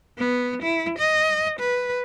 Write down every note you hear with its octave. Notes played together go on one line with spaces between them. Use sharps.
B3
E4
D#5
B4